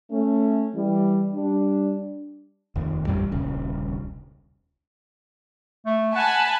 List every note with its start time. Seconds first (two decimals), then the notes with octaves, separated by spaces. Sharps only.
0.11 A3 C#4
0.75 E3 G3
1.34 G3 D4
2.76 F1 D#2
3.07 A1 F2 G3
3.31 D#1 C2 C#3
5.86 A3
6.15 F#5 G#5 A5 B5